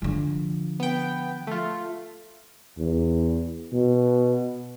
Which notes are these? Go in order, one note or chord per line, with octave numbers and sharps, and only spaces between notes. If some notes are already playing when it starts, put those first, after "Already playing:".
D3 F3
B3 G5
A3 F4
E2
B2